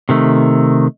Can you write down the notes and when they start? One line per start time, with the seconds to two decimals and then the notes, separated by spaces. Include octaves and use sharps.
0.09 C3 D#3 A3